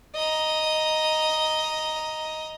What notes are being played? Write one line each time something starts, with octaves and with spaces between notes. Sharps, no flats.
D#5 A#5